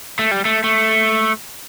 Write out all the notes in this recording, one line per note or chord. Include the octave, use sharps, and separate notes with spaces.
A3
G3
A3
A3